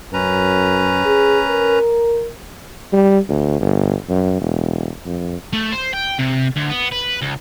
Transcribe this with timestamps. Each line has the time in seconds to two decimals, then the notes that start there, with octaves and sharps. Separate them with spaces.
0.13 F#2 C#4 B4 A#5
1.05 G#4
1.49 A#4
2.93 G3
3.29 D2
3.60 G1
4.09 F#2
4.41 E1
5.05 F2
5.53 A3
5.72 C5
5.93 G5
6.19 C3
6.57 D2
6.70 B3
6.92 B4
7.22 C#2